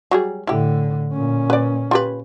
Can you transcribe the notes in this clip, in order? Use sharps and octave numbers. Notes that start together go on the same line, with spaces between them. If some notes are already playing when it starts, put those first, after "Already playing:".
F#3 G3 G#4
A2 D3 E4 G4
A#2 C#4
B4 D5
F4 G4 B4